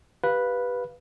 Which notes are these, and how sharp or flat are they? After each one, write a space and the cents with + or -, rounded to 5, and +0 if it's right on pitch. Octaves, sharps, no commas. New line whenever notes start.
G4 -10 B4 -5 F5 +0